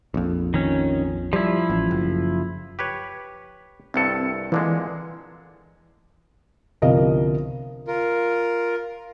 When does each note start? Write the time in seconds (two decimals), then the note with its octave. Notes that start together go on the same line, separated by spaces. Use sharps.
0.14 A#1 F2
0.54 D#3 C#4
1.33 F3 G3 E4
1.70 A1
1.91 F#1
2.79 G4 B4 C#5
3.94 C2 G2 C4 A4 C#7
4.52 A#2 D3 E3 G#3
6.82 G1 C2 F3 A#4 D#5 F5
7.87 F4 A#4